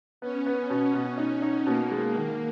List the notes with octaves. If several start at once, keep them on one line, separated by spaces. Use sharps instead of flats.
B3 C#4
B3
B2
B2
D#4
D#4
B2 A#3
G#3
D#3